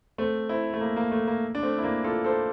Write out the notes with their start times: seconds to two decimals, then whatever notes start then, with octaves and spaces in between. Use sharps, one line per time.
0.18 A3 C4
0.49 C4 E4
0.73 A3
0.81 A#3
0.96 A#3
1.12 A3
1.27 A#3
1.55 D4
1.63 A3 C4
1.78 E4
1.83 A#3 D4
2.04 F4 A4
2.24 A4 C5